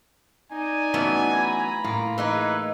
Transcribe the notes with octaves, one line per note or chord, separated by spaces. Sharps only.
D#4 D5 G#5
E3 F#3 A3 B3 C#4
A#5 B5
A2 A#3 F4
E3 G#3 D#4 B4